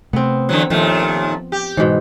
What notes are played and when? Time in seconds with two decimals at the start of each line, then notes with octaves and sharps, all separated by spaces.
0.13 C3 A3 B3 C4
0.49 D3 E3 F#3
0.70 D#2 A#2 F3 A3
1.52 G4
1.77 G#2 B2 E3 G#3